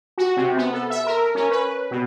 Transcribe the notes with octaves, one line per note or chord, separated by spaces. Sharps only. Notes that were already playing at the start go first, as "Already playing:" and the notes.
F#4
C3
B3
A4
E5
A#4
C#4
B4
B2